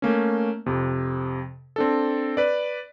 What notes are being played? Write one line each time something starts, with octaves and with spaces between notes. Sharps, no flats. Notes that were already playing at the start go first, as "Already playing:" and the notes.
A3 A#3 C#4
F2 C3
C4 D4 A4
B4 D5